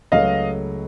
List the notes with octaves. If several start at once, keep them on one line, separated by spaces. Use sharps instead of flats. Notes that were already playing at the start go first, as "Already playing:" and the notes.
C#2 C#3 F#3 A3 D#5 F5